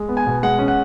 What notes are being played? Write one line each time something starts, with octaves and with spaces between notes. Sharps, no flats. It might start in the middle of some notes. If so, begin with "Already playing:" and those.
Already playing: G#3
B3
G#5
B2
G#3 F#5
C#4
F#5